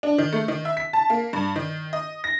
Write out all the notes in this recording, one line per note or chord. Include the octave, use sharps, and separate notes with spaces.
D4
D#3
A3
D#3
E5
B6
A5
A#3
G2
D#3
D#5
A#6